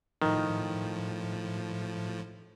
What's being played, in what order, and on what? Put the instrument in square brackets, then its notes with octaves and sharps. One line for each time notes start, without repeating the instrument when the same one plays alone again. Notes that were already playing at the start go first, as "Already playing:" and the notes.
[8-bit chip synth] A2 F3 [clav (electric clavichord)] D#3